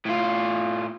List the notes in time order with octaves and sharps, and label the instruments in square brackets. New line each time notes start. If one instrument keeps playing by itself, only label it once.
[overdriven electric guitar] A2 F4